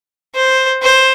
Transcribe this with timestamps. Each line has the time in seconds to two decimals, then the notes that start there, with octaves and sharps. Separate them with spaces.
0.35 C5
0.82 C5